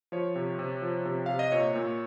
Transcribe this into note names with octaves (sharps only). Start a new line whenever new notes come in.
F3 C#5
C3
C3
F3
C3
C3 F5
D#5
A#2 C#5
A#2